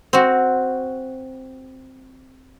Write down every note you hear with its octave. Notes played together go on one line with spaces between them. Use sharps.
C4 F#4